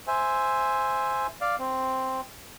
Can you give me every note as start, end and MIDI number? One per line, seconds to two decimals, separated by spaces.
0.07 1.27 72
0.07 1.27 76
0.07 1.27 80
1.41 1.56 74
1.41 1.56 77
1.59 2.21 60